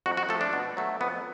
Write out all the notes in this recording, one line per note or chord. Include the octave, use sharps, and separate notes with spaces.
F2 F#4
F#4
F3 A3 A4
D4
B2
F#3 A3
F2 B3